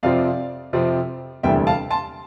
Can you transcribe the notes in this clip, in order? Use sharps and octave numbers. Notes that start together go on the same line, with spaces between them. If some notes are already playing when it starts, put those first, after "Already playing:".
F2 C3 F3 C4 D5 F5
F2 C3 F3 C4
E1 D2 C3 E3 G3 E5 G5
F5 A5
A5 C6